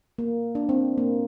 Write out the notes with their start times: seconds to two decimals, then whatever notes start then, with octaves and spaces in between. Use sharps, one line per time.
0.18 A#3
0.55 D4
0.69 C4
0.98 A#3